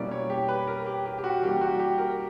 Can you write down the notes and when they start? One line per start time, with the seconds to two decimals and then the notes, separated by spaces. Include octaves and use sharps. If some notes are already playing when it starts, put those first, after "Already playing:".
Already playing: B2 G3 A#3 C#4 E4 D5
0.11 C#5
0.30 G4
0.48 B4
0.67 A#4
0.86 G4
1.05 G4
1.18 G4
1.24 F#4
1.42 C#3 E3 G3 A#3 G4
1.61 F#4
1.79 G4
1.98 A#4